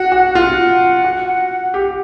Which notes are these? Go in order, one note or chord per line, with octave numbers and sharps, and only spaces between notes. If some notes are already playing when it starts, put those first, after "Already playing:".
Already playing: F#4 F#5
F#4
F4 F#5
F#4
G4